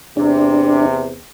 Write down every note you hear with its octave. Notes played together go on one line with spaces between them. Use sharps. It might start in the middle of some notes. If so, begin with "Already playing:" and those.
E2 C3 D4